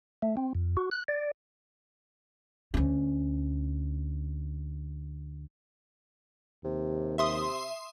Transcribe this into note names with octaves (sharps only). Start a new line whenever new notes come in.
A3
C4
F2
F#4
F#6
D5
D2 C#4
D#2 C3
C3 E5 C6 D#6